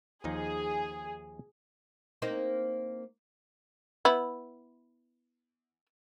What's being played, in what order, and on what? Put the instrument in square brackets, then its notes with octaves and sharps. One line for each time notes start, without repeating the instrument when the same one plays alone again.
[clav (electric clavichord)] D#2 F3 D#4 [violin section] G#4
[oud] A#3 C4 D#4
[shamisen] B3 E4